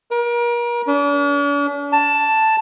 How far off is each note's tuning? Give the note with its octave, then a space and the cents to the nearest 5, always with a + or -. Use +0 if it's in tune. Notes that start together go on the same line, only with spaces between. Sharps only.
A#4 +35
D4 -45
A5 +5